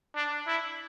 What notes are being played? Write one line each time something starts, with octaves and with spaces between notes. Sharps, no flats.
D4
E4